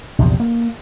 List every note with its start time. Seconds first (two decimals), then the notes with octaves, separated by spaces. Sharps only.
0.19 A#1 E2 C3
0.40 A#3